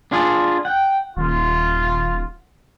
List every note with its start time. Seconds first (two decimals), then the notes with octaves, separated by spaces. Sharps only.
0.12 D4 F4 G#4
0.65 F#5 G5
1.17 D#1 F4